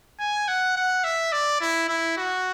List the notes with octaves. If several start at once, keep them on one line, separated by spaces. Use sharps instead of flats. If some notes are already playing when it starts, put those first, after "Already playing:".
G#5
F#5
F#5
E5
D5
E4
E4
F#4